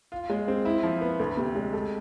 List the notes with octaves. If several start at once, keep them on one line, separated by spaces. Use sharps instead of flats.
F4
G#3
C4
E4
F3
B3
D2
C3
G#3
A4